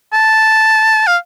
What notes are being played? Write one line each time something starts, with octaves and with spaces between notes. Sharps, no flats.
A5
F5